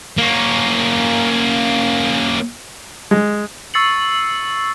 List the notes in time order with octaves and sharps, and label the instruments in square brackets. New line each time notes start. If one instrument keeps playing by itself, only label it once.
[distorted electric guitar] A#3 C#4
[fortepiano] G#3
[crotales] C#6 E6 A6 C7 C#7 F#7